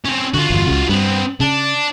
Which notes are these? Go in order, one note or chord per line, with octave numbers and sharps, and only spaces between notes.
C4 C#4
D3 F4 F#4
G1 E2
C#2 C#3
G2 B3 C4
C#3 D4